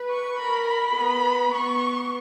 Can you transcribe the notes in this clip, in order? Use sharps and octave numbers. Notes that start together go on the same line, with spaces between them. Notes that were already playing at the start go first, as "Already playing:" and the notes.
Already playing: B4
C#6
A#4 B5
B5
B3
B3 C#6